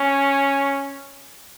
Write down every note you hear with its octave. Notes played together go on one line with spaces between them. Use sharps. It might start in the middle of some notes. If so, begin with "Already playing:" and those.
Already playing: C#4